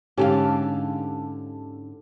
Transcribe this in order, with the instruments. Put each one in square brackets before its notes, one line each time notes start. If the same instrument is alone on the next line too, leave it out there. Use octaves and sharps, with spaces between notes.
[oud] G#2 D3 F5 [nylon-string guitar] C#4 G4 A4